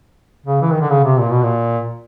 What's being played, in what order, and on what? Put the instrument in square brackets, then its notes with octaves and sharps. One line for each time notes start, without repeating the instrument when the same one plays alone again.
[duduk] C#3
E3
D#3
D3
C#3
C3
A#2
B2
A#2